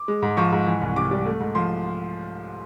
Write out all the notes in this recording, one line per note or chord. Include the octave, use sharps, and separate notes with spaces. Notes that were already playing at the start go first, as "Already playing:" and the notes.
Already playing: D6
G#3
G#2
F3 C#6
G#2
E3
C2
C3 D6
G3
A3
G#2
F3 C6